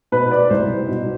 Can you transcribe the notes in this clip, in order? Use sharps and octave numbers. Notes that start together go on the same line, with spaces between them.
B2 B4
D5
C2 C5
B2